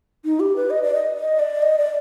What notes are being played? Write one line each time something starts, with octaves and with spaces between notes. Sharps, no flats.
D#4
G4
B4
D#5
D5
D#5
D#5
D5
D#5
D5